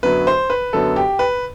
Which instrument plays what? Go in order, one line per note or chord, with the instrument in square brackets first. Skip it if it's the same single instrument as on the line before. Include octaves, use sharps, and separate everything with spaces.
[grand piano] F#2 D3 F#3 B3 B4
C5
B4
F#2 D3 F#3 B3 A4
G4
B4